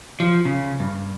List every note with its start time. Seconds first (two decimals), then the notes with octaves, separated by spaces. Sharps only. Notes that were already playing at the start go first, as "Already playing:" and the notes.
0.20 F3
0.45 C#3
0.80 G2